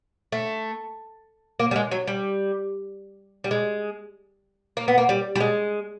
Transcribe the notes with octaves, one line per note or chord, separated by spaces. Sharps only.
A3
A#3
G3
G#3
F#3
G3
G3
G#3
A#3
B3
A#3
G3
G3
G#3